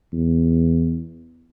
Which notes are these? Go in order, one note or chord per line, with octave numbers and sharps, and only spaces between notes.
E2